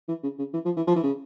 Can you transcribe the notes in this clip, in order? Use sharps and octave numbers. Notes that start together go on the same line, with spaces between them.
E3
C#3
C#3
E3
F3
E3
F3
E3
C#3